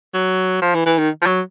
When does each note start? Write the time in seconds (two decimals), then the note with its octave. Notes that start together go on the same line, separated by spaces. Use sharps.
0.14 F#3
0.62 F3
0.75 E3
0.86 E3
0.98 D#3
1.22 F3
1.26 F#3